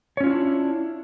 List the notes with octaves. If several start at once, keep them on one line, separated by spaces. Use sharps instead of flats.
C#4 D4 E4 F4 C#5